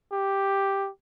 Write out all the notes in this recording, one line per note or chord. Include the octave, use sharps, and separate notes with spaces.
G4